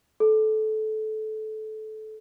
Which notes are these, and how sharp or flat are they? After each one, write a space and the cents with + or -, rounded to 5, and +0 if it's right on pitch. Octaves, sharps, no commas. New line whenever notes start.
A4 -20